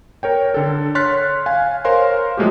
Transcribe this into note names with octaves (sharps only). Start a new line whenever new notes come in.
A#4 C#5 G5
D3 A4
C#5 C6 F6 F#6 A6 B6
F5 G#5
A#4 C5 C#5 F5 C6
F3 F#3 G#3 A3 F#4 G4